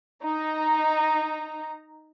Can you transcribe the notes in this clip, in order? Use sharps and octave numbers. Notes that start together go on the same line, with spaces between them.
D#4 A#5